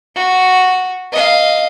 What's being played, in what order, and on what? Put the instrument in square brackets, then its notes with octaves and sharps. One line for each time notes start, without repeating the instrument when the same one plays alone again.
[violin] F#4
D#5 F5